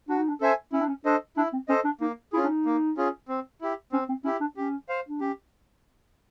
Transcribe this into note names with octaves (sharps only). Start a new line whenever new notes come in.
D4 F#4
D#4
D4
C#4 A4 C5 E5 G#5
C#4 E4
D4
C#4
D4 A4 C5 D#5
D4 E4
C4
C#4 A4 C5 D#5
D4
A#3 D#4
C#4 E4 F4 G#4
D4
D#4
A#3
C#4 F4 G#4
C4
E4 G4
C4 C#4
C4
C#4 E4 G4
D4
C#4 G4
C5 F5
D4
C#4 G4